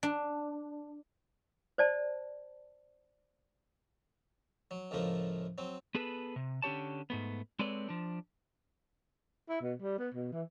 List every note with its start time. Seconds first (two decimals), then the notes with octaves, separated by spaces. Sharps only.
0.03 D4
1.78 C5 D5 A5
4.71 F#3
4.91 C#2 A2 F3 A3 A#3
5.58 F#3 C4
5.95 B3 G#4 A4 B4
6.36 C3
6.62 D3 C#4 G4 C#5 A5
7.10 G#2 A3 B3
7.59 G#3 C4 A4 B4 C#5 D5
7.89 F3 D4
9.49 E4
9.61 B2
9.82 G3
9.98 B3
10.14 B2
10.33 E3